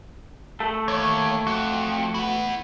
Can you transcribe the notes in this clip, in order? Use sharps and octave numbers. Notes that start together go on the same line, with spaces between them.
A3 A4
D#2 C#5
F2 F#4
E4 F#5